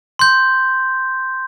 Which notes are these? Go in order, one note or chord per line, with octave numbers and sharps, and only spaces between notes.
C6 G6